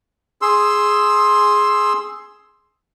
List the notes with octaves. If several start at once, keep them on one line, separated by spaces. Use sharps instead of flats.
G#4 C6 E6